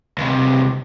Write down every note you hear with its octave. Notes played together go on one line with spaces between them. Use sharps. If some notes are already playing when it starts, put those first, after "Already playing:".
C#2 C3